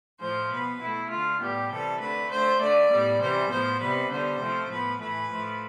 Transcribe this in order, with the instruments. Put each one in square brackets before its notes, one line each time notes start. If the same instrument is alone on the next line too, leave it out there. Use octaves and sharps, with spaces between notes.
[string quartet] A2 F3 A3 C5
B2 B3 B4
B2 A3 E4
D3 A3 F4
A2 G3 B3 G4
C3 E3 G3 A4
D3 A3 B4
D3 A3 C5
D3 A3 D5
A2 G3 B3
C3 E3 G3 C5
A2 F3 B3 C5
C3 G3 B3 B4
D3 G3 B3 C5
C3 F3 A3
A2 F3 B3 B4
A2 E3 A3 B4
A2 F3 A3